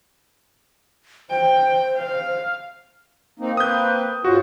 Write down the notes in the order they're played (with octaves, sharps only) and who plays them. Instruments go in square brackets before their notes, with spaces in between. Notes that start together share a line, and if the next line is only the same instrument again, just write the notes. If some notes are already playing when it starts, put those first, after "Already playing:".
[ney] C5 [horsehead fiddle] G5
[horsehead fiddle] F5
[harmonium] A#3 C4 D#4
[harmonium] A#3 C4 B4 [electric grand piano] D#6 G6
[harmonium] G#2 C#4 F4 [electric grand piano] F#4